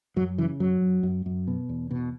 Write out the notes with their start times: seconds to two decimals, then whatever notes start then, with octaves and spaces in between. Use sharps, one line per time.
0.16 F#2 F#3
0.38 C#3 E3
0.60 F#2 F#3
0.81 F#2
1.03 F#2
1.26 F#2
1.47 B2
1.69 E2
1.91 B2